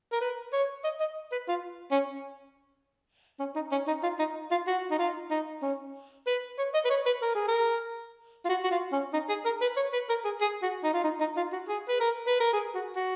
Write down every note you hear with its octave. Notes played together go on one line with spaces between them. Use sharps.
A#4
B4
C#5
D#5
D#5
B4
F4
C#4
C#4
D#4
C#4
D#4
F4
D#4
F4
F#4
D#4
F4
D#4
C#4
B4
C#5
D#5
B4
C#5
B4
A#4
G#4
A#4
F4
F#4
F#4
F4
C#4
D#4
G#4
A#4
B4
C#5
B4
A#4
G#4
G#4
F#4
D#4
F4
D#4
D#4
F4
F#4
G#4
B4
A#4
B4
A#4
G#4
F#4
F#4